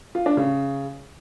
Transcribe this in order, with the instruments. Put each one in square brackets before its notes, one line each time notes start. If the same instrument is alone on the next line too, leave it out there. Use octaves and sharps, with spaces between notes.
[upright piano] F4
D4
C#3